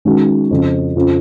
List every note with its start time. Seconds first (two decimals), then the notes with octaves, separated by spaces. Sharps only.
0.05 D#3 G#3 C#4 F#4
0.51 F2 C#3 F3
0.96 F2 C#3 F3